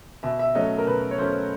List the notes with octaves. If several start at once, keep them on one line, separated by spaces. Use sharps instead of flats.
B2 E5
E5
F#3 A3 C#4 D#5
A#4
B2 B4
C#5
F#3 A3 C#4 C5